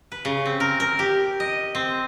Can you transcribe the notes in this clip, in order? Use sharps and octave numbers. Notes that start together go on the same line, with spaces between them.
B4
C#3
C4
A#4
A#4
G4
D#5
C4